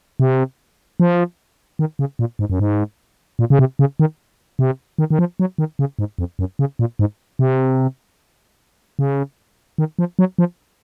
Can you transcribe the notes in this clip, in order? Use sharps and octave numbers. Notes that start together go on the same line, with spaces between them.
C3
F3
D#3
C#3
A#2
G#2
F#2
G#2
A#2
C#3
C3
C#3
D#3
C3
D#3
D#3
F3
F#3
D#3
C#3
G#2
F2
F#2
C#3
A#2
G#2
C3
C#3
D#3
F3
F#3
F3